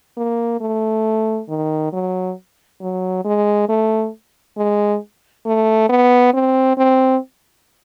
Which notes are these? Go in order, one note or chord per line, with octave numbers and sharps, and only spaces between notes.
A#3
A3
D#3
F#3
F#3
G#3
A3
G#3
A3
B3
C4
C4